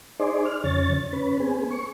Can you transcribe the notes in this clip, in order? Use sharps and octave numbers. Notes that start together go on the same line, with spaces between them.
D#4 G#4 C5 D5
F6
F2 C#3 C#5 A6
C#4 B4
B3 C4 G#4
C#6